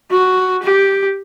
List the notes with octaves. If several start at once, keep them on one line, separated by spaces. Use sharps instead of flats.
F#4
G4